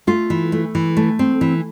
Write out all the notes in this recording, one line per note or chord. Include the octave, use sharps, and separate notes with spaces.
A3 F4
E3
A3
E3
A3
C4
E3